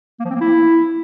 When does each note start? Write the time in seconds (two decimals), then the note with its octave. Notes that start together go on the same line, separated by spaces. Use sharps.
0.20 A#3
0.25 F3
0.30 C4
0.35 A#3
0.40 E4